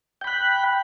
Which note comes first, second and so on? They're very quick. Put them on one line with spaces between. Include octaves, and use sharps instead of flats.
G5 B5 F#6